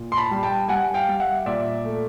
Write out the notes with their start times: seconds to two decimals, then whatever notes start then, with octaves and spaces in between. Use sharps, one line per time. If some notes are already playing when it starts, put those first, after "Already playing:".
Already playing: A#2
0.12 C6
0.17 A5 B5
0.31 G3
0.43 G5 A5
0.68 G3 F#5 G#5
0.94 F5 G5
1.08 G3
1.20 E5 F#5
1.46 A#2 D5 E5
1.84 A3